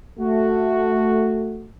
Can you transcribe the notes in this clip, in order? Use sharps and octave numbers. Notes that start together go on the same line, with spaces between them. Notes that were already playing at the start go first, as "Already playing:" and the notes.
A3 F#4